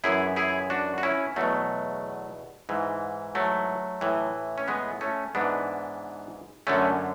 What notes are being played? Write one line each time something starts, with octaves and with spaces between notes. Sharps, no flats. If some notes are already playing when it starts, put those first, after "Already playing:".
F#2 E3 E4 G#4
E4 G#4
D4 F#4
F#4
C#4 E4
E2 B2 F#3 A3
G#2 E3
F#3 A3
A2 E3
C#4
G#3 B3
A3 C#4
G#2 E3 B3 D4
F#2 D3 A3 C#4